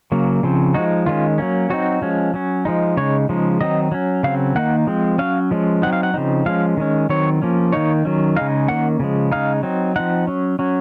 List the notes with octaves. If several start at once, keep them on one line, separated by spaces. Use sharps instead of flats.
C#3 F#3 A#3
C#3 F3 C4
F3 G#3 D#4 F#4
D#3 G#3 C#4 F4
F#3 A#3 C#4
F#3 C4 D#4 F#4
F3 G#3 C#4
F#3 C#4
F3 G#3 D#4
C#3 G#3 D#4 C#5
C#3 F3 G#3 D#4
D#3 F#3 C4 D#4 D#5
F#3 C#4
C#3 F#3 C4 F5
D#3 A#3 D#4 F#5
F3 G#3 C4
F#3 C#4 F5
F3 G#3 C#4
F#3 C4 D#4 F#5
F5
F#5
C#3 F3 C4 D#4
F3 G#3 C#4 F5
D#3 G#3 C#4
D#3 F#3 C4 C#5
F3 A#3 C#4
D#3 A#3 D#4 C#5
D#3 F#3 C#4
C#3 G#3 D#4 F5
D#3 A#3 C#4 F#5
C#3 F3 G#3
C#3 G#3 D#4 F5
F#3 C4 D#4
F3 C4 D#4 F#5
F#3 C#4
F#3 C#4